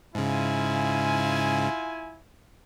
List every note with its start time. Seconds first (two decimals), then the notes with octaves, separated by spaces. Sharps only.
0.15 G#2 C#3 E4 F4 G#5